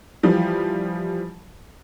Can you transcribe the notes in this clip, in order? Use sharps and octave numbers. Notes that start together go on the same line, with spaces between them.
E3 F3 G3